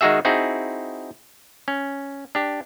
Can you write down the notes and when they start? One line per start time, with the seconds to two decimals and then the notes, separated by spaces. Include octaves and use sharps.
0.01 D#3 G#3 D#4 F#4 G#4 E5
0.25 C4 D#4 E4 F#4 G#4
1.68 C#4
2.35 D4 G4